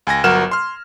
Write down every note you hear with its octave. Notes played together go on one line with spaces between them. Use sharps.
C#2 G#5 G#6 A#6
G1 F#3 A#4 F#5 F6 E7
C6 F6